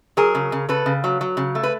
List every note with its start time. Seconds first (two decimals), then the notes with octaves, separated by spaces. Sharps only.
0.17 F#3 G#4 A#4
0.35 C#3
0.52 C#3
0.69 C#3 A4 B4
0.86 C#3
1.04 F#3
1.21 F#3
1.37 C#3
1.55 A3
1.63 B4